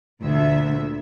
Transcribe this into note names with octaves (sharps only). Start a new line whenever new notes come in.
D2 A#2 D3 E5